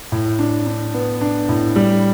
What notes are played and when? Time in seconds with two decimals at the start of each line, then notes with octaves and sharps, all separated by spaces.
0.12 A2
0.39 D4
0.67 D4
0.94 B3
1.21 D4
1.49 A2
1.76 G3